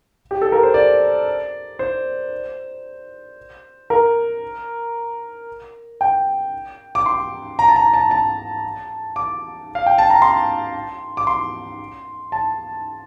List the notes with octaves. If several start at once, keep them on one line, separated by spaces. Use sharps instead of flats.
G4
A4
A#4
C5
D5
C5
A#4
G5
D6
C6
A#5
A5
A#5
A5
A5
D6
F5
G5
A5
A#5
C6
D6
C6
A5